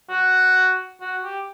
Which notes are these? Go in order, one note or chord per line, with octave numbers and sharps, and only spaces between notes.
F#4
F#4
G4